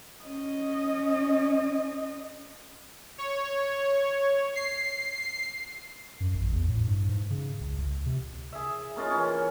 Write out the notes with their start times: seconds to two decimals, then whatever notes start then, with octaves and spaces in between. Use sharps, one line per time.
0.25 C#4 D#5
3.18 C#5
4.55 C7
6.20 F#2
6.35 A1
6.52 E2
6.68 A2
6.87 G2
7.09 G#2
7.31 C#3
7.61 C#2
7.78 C#2
8.06 C3
8.52 G#4 E5
8.96 A#3 C#4 D#4 F4
9.10 E3 C#4